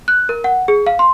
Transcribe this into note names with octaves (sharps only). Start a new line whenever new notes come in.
F#6
A#4
F#5
G#4
F5
C6